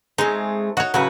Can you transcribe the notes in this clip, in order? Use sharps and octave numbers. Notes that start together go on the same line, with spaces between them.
G#3 A3 C4 D#4
D#4 F#4 C#5
A2 C#3 F#3 F#4 B4